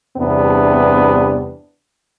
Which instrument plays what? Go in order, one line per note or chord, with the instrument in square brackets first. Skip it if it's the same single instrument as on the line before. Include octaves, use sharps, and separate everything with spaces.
[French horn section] E2 G2 C3 B3 D4